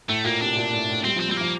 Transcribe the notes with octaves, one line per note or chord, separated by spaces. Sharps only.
A2 A3
A#2 A#3
C3 D4
A#2
A2
A2
G3 C4
F3 C4
G3 C4
F3 A#3